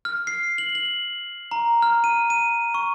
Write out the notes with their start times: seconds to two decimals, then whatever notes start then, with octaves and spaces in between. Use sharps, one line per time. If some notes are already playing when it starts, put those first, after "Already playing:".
0.05 F6
0.27 C7
0.58 F#7
0.75 F#7
1.51 A#5
1.82 F6
2.04 D#7
2.30 D#7
2.74 C#6